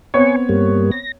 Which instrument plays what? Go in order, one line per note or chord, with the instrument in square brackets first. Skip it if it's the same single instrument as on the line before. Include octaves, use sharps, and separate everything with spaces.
[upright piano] B3 C4 C#5 [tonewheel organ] G#5 C#6
[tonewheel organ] G2 G3 A#3
A#6